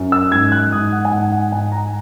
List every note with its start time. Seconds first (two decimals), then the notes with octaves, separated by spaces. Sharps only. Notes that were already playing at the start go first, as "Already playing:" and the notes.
Already playing: F#2
0.12 E6
0.32 G#2 G#6
0.52 F#6
0.72 G#2 D#6
0.92 F#5
1.05 G#5
1.12 G#2 F#5
1.32 F#5
1.52 G#2 G#5
1.72 A#5